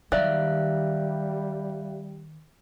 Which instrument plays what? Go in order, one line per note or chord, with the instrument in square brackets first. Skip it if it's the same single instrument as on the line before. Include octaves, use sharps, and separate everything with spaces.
[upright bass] D#3 [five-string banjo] F#3 D5 [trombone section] G3 [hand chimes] E5 F5 F#6